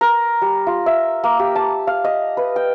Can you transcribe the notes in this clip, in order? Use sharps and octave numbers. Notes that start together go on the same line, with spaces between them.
A#4
G3
F4
E5
A#3
G4
A5
F5
D#5
B4
G5